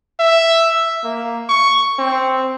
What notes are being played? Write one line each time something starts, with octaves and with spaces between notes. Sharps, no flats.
E5
A#3
C#6
C4